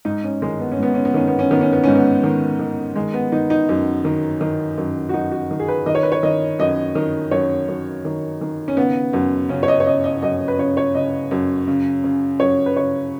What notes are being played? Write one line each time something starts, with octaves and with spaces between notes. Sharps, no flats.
G#2 D#4
C#4
D#3 G#3
B3
C#4
G#2 B3
C#4
B3
D#3 C#4
B3
C#4
D#3 B3
C#4
B3
G#2 C#4
B3
D#3
D#3
D#3 G#3
B3
D#3 D#4
D#4
F#2
D#3
D#3
F#2
F#4
F#2 D#4
F#4
D#3
G#4
B4
D#3 D#5
C#5
B4
C#5
D#3 D#5
F#2 D#5
D#3
F#2 C#5
F#2
D#3
D#3
C#4
C#3 B3
F#2
C#3 C#4
C#5
D#5
C#5
C#3 D#5
D#5
F#2 D#5
B4
C#3 C#5
C#5
C#3 D#5
F#2
C#3
C#3
F#2 C#5
B4
C#3 C#5